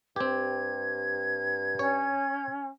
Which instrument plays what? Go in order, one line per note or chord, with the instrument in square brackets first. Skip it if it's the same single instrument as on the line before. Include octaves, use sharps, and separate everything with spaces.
[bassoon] G2 [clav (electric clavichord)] C4 G4 [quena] G#6
[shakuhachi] C#4 [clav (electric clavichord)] C#5